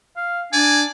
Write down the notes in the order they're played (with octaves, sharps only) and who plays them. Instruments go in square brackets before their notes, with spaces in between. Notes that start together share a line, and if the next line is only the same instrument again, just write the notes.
[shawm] F5
[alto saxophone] D4 [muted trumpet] D5 [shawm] G#5